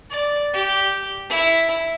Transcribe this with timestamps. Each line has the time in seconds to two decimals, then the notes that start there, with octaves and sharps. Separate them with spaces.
0.10 D5
0.54 G4
1.30 E4